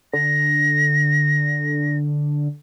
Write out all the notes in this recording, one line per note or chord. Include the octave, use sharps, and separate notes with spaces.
D3 A#6